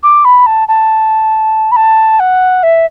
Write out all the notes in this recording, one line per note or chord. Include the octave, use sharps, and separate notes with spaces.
D6
B5
A5
A5
B5
A5
F#5
E5